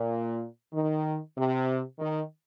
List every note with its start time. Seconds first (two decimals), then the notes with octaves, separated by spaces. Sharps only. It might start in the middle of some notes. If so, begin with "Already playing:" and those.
Already playing: A#2
0.72 D#3
1.36 C3
1.98 D#3